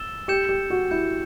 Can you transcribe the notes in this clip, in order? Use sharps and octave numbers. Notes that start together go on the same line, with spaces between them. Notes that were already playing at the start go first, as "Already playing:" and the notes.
Already playing: E6 A6 E7 G7
G4 G6 C#7 E7
G4
F#4
E4 G6 C#7 E7